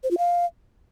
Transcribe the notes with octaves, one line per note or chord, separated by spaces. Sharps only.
C5
F4
F5